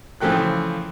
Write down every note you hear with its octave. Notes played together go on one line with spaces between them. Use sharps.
C#3 E3 F3 A3 G5 F#6